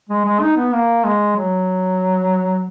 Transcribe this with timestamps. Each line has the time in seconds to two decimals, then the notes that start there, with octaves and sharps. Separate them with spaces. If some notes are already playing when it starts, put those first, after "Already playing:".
0.09 G#3
0.25 G#3
0.41 D#4
0.57 B3
0.73 A#3
1.04 G#3
1.36 F#3